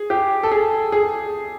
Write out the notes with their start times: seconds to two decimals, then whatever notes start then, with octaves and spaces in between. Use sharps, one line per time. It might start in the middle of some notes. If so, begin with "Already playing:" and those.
Already playing: G#4
0.10 G4
0.43 A4
0.52 G#4
0.92 G#4